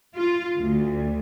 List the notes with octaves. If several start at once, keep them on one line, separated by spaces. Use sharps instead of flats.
F4
D2